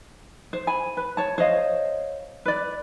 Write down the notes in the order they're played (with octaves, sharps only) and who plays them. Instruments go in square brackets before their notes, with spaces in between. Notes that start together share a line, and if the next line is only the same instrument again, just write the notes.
[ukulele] C5
G#5 B5
B4
C#5 A5
C5 C#5 D#5 F5
B4 D5